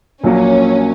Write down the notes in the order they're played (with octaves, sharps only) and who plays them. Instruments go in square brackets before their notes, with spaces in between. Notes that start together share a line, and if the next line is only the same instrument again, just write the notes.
[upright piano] A#1 A#2 F#3 A#3 [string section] C#4